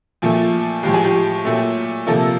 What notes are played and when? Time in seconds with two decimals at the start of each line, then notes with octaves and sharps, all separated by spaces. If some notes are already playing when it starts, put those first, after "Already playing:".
0.22 A#2 F3 A3
0.83 A2 F3 G#3 G4
0.94 G#4
1.05 G4
1.45 A#2 F#3 A3
2.07 C3 F3 A#3 A4